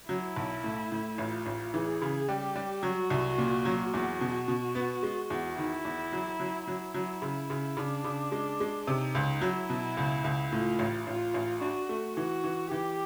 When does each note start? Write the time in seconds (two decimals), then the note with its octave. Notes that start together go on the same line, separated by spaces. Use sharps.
0.09 F#3 E4
0.37 B1
0.64 A2
0.92 A2
1.18 A1 F4
1.46 A1
1.74 E3 G#4
2.02 C#3
2.28 G3 G4
2.56 G3
2.83 F#3 F#4
3.10 C2
3.38 A#2
3.65 F#3
3.94 E2 F#4
4.21 B2
4.48 B2
4.75 B3
5.03 G#3
5.30 E2
5.58 D#3 E4
5.85 E2
6.12 F#3
6.40 F#3
6.67 F#3 E4
6.94 F#3
7.22 C#3
7.50 C#3
7.77 C#3 D4
8.04 C#3
8.32 G#3
8.60 G#3
8.87 C3 D#4
9.15 C#2
9.41 F#3 E4
9.69 B2
9.97 C#2
10.24 C#2
10.52 A2 F4
10.79 A1
11.07 A1 F4
11.34 A1
11.61 D4 F#4
11.89 A3
12.17 E3 F#4
12.44 E3
12.71 E3 G4